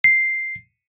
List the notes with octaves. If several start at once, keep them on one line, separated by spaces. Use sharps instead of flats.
C7